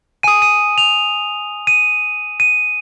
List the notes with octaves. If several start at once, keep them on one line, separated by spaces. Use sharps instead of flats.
G#5 D#6 D#7
D#7
F7
D#7
D#7